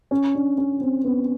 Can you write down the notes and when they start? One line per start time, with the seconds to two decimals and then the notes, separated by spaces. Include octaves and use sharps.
0.11 C#4
0.35 D4
0.58 C#4
0.81 C4
1.05 B3